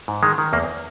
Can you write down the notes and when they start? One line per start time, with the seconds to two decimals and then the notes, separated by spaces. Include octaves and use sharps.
0.08 G#2
0.23 D#3 G#3
0.38 D#3
0.53 E2 A#3